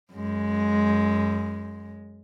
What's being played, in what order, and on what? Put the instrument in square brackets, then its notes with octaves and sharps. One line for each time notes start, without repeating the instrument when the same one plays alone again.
[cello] F#2 G#3